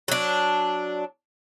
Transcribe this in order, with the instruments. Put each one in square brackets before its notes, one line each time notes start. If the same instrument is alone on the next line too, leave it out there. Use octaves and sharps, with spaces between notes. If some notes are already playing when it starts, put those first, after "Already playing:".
[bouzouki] F#3 D4